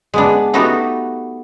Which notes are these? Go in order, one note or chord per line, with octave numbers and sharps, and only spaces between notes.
G#3 B3 D4
A3 B3 D#4 F#4 G4 A4